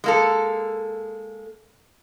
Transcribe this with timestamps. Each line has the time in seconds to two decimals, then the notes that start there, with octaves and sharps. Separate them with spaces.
0.04 G#3 A#3 A4